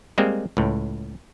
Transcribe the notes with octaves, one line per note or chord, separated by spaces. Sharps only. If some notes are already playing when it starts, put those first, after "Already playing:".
G3 G#3 A#3 C4
C#2 A2